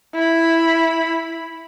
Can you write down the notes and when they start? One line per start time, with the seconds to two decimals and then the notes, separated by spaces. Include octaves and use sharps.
0.15 E4 B5